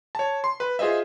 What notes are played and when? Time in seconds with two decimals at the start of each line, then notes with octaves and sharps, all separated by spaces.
0.15 C#5 A5
0.44 C6
0.60 B4
0.79 F4 G#4 C5 D#5 E5